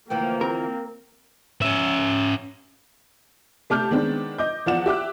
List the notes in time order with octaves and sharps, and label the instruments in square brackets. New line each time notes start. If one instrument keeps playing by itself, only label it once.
[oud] D2 E3 F3 [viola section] A#3 [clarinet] G5
[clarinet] C4 [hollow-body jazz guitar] A#4
[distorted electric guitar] C#4 E5
[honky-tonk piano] C3 A3 A5 D6 F6 G6
D#3 G#3 B3 C4 D4
D#5 D6 G6
E2 F3 D5 F#5 D6 E7
G4 E5 D6 F#6